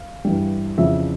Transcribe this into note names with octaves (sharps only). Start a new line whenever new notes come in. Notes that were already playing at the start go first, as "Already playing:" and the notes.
Already playing: F5
G2 E3 G3
F2 C#3 E3 E5